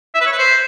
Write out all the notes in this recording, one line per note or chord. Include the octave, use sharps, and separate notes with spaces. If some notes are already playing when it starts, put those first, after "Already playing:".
E5
B4
C#5
B4
C5